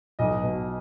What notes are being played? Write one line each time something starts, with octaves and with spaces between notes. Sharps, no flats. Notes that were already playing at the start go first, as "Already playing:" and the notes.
B1 D#5
B2